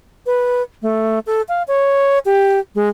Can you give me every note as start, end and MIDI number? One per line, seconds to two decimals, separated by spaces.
0.26 0.62 71
0.82 1.19 57
1.27 1.42 69
1.49 1.63 77
1.68 2.19 73
2.25 2.59 67
2.75 2.89 56